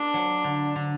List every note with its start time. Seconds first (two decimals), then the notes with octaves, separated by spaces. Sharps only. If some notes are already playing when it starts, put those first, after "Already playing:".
Already playing: A#3 D4
0.14 F#3
0.44 D3
0.76 D3